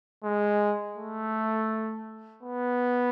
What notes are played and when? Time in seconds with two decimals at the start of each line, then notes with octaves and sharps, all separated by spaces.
0.24 G#3
0.97 A3
2.43 B3